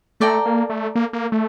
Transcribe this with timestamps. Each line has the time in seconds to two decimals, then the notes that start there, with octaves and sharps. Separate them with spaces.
0.20 A3 A4 D5 G5 A#5
0.46 A#3
0.70 A3
0.95 A#3
1.13 A#3
1.32 A3